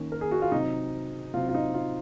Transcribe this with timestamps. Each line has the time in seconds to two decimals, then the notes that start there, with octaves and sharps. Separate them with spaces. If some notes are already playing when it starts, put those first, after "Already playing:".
Already playing: D#3 A#3 C#4
0.12 A#4
0.21 G#4
0.31 F#4
0.42 F4
0.52 C3 F#3 C4 D#4
1.33 C3 F#3 C4 F4
1.49 F4
1.54 D#4
1.74 F4